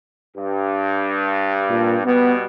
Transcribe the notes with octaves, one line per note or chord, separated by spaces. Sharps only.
G2
A#2
B2 G3 B3